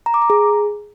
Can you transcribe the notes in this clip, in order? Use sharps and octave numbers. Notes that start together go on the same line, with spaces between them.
A#5
D6
A#5
G#4